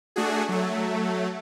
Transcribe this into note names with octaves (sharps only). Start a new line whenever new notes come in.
A3 D4 F#4 G#4
F#3 A3